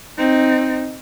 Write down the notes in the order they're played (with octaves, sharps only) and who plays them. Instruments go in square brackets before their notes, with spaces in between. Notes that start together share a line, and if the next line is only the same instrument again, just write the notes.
[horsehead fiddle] C4 D#4